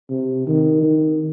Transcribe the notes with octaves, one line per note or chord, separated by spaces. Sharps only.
C3
D#3
D#3